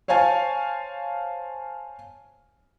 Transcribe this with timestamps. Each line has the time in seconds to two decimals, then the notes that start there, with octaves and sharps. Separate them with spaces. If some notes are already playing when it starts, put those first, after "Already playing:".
0.08 C5 C#5 F5 G#5 A5